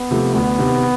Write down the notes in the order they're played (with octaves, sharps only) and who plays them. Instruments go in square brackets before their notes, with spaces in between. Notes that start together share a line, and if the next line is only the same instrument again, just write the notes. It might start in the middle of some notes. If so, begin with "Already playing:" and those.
Already playing: [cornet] B3
[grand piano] C3 F3 A3
[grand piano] D2 [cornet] B3
[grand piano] C3 D#3